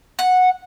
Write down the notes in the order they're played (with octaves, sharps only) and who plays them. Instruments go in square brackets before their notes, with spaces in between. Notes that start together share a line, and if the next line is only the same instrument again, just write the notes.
[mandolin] F#5